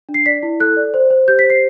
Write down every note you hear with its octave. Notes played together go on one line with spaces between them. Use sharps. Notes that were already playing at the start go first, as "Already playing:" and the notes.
D4
C7
D5 B6
E4
A4 F#6
D5
C5
C5
G4 G6
B6
C5
C7